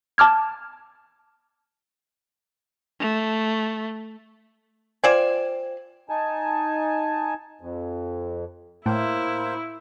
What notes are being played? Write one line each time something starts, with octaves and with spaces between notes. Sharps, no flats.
A5 D6 F6 G#6
A3
F4 C5 D5 G5 G#5 E7
D#4 G#5 A5
F2
A2 A#3 E4 C5